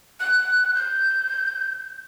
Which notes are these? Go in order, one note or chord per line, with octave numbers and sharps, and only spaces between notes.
F#6
G6